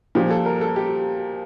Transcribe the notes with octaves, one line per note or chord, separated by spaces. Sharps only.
A#2 F3 G4
A4
A#4
A4
G4